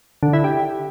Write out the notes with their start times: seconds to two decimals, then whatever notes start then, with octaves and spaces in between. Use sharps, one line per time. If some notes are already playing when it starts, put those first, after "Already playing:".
0.23 D3
0.33 E4
0.44 G4